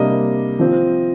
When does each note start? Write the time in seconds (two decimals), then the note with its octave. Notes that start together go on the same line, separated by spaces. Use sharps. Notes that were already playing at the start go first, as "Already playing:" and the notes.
Already playing: C3 G3 A#3 D4 D#5
0.59 F3 C4